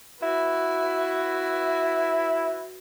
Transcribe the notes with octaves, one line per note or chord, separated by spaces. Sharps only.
E4 F#4 B4